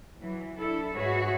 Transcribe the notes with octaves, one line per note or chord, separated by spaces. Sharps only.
E3 F#3
D4 E4 A4
G#2 F#4 G#4 B4 C#5 E5